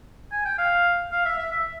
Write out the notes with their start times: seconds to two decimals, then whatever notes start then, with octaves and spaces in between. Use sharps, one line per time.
0.32 G#5
0.45 G5
0.58 F5
1.12 F5
1.25 E5
1.38 E5
1.52 E5